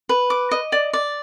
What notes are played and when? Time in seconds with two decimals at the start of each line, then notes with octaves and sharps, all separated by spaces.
0.09 B4
0.30 D6
0.51 D#5
0.72 D5
0.93 D5